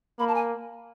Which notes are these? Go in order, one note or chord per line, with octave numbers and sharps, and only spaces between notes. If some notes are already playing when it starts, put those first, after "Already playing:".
A#3 B5
A5
G#5